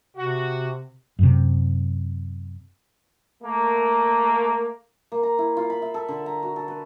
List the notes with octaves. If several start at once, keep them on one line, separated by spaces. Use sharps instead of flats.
C3 F#4
F#2 C3
A3 A#3
A#3
A#5
E4
F4
B5
E5
A4
D3
A#5
F#4
A4
B4